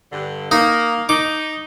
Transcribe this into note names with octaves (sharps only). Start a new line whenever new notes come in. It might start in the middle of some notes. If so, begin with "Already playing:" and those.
G2 D3
A#3 D#4
D#4 D6